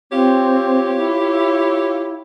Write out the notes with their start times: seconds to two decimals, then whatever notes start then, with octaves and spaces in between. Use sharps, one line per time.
0.12 C4 F4 G4 C#5
0.97 E4